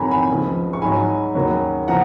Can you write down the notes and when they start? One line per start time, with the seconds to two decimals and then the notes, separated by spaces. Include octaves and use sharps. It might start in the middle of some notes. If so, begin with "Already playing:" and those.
Already playing: F2 D#3 F#3 G#5 A#5 B5
0.11 G#5 B5
0.29 C#2 C#3 F3
0.73 C#6
0.82 G#2 F#3 G#5 B5
1.35 D#2 C#3 F#3
1.88 C#3 F3 F#5 A#5